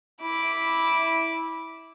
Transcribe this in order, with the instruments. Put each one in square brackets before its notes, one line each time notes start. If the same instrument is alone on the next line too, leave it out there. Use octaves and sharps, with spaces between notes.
[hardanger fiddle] E4 D6